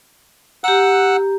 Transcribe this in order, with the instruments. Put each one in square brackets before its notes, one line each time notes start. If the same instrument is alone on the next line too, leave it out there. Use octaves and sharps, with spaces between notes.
[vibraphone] G4 A#5 [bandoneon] F#5 E6 F#6